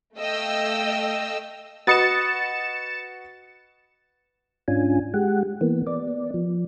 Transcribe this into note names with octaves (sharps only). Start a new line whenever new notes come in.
A3 D#5 F5 G5 E6
F#4 B4 D#5 A6 C#7 E7
G#2 C#4 D4 F4 G#5
G#3 G4 F#5
E3 A#3 B3
B3 D5
F3